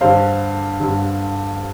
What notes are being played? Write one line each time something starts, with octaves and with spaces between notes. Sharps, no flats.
G2 D3 C5 F5
G2 D3